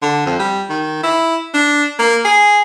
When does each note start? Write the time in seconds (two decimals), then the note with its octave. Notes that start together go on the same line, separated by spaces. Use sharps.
0.02 D3
0.26 F2
0.40 G3
0.70 D#3
1.03 E4
1.54 D4
1.99 A#3
2.25 G#4